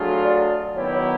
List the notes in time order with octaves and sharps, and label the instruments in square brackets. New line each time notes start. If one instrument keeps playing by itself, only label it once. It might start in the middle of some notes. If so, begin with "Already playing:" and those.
Already playing: [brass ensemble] F#3 A3 D4 F4 G#4
[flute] D5
[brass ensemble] D#3 F#3 B3 E4 G4 [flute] C#5
[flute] C#5